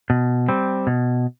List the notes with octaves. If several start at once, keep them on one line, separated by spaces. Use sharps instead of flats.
B2
G3 C4
B2